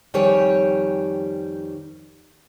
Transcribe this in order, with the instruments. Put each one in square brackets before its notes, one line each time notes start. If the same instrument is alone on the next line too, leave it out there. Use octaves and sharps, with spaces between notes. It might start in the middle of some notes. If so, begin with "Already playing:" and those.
[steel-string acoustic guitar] F2 D#3 G3 G4 C#5 G#5